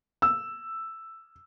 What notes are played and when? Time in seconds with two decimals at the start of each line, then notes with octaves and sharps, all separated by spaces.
0.22 E6